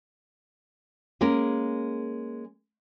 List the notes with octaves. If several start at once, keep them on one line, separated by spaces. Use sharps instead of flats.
G#3 A#3 C#4 A#4